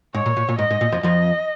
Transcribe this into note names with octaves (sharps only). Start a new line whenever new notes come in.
G#2 C#5
A#2
A#2
A#2
G#2 D#5
G#2
A#2
F2 F3
F2 F3 D#5